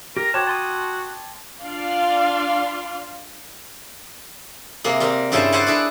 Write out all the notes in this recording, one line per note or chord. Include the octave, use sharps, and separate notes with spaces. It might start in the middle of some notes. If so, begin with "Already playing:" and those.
G4 A#4 A#6
F#4 C5 C#5 G5 A5 D6 G#6
A5 C6 D#6
D4 F4 D5 F5 C6
C3 A#3 G#4
G3 C4 A#4
G2 C#3 E4 G#4 C5 A5
C5 D5 E5 F#5 G#5 A5
D4 E4 G#4 B4